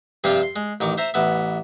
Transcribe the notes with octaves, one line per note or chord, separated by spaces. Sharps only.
G2 C3 F3 C4 F4
C6
G#3
A1 D#3 C#6 D6
C5 E5 A#5
A1 B3 E5